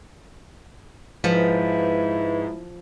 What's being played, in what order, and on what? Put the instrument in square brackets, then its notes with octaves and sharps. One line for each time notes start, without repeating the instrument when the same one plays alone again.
[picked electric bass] G#2 [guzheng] F3 [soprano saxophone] E4 [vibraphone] B4